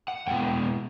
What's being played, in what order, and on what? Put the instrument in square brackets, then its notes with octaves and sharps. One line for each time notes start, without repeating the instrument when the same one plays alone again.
[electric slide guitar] F#5
B2 G#3 B3 E4 G5